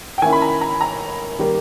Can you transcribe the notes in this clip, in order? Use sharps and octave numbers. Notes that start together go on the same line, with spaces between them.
G5
D#3 A#3 C#4 E4 G#5
B5
A#5
A#5
A#5
D#3 G3 A#3